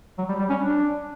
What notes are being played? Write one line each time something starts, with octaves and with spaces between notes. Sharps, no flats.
F#3
G3
G3
C#4
D4